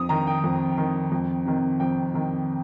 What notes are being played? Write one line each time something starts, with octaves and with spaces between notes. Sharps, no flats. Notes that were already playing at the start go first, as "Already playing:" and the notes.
Already playing: F2 D#6
D#3 A#5
G5
F2
D#3
F2
C3 D#3
F2 G5
C3 D#3